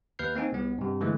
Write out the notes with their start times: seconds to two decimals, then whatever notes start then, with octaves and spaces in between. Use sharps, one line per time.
0.19 D#2 B4 F6 G6 C7
0.35 A#3 C4 D#4 G#5
0.52 C2 B3
0.78 G2 C3
1.01 D3 E3 G#3 A3